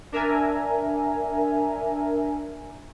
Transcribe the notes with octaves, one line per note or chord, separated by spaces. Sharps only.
D4 A#4 E5 G#5 A#5